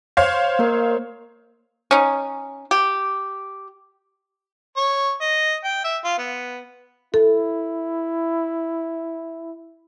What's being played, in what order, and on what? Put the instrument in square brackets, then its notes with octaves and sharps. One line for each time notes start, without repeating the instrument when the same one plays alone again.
[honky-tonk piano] C5 C#5 F5
[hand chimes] A#3 A#4
[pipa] C#4 D#4
G4
[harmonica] C#5
D#5
G5
E5
F4
B3
[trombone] E4 [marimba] A4